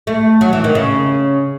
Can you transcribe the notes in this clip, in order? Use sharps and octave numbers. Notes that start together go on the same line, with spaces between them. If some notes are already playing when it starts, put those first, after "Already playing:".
A3
F#3
E3
D#3
C#3